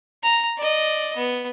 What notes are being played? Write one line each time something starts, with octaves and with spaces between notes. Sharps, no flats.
A#5
D5 D#5
B3